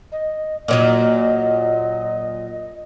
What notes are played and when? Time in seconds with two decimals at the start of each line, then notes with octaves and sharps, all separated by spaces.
0.12 D#5
0.68 A#2 F#3 D#4 D#5